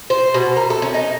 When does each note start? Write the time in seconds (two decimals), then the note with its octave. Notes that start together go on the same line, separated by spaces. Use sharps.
0.10 C5
0.34 B2
0.57 A#4
0.70 A4
0.82 C#4
0.94 D#4